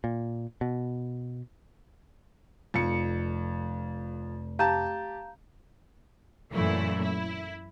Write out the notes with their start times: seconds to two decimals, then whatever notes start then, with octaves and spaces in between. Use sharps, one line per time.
0.04 A#2
0.61 B2
2.74 F1 F2 C#7
4.59 G4 F5 A5 A#5 G6
6.52 F#2 A#2 E3 A3 E4
7.02 E4